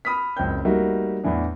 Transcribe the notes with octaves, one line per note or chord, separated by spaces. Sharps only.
B5 D#6 F6 B6
F#1 C#2 C4 G5 G6
G3 A3 A#3 D#4 F#4 E5
E2 A2 E3 D4